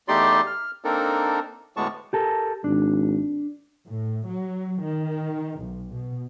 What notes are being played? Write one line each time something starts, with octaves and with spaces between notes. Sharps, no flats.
E2 A3 D#4 G4 D5 C6
F6
A#3 C4 D4 D#4 A4 A#4
D2 A2 G#3 B3 A5 C#6
G4 A4 A#4
G#1 D4
A2
F#3
D#3
B1
B2